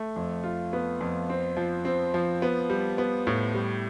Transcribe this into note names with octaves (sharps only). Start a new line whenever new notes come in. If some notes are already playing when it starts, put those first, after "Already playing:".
Already playing: A3
F2
F4
B3
F2
C4
F3
C4
F3
B3
G3
B3
A2
G3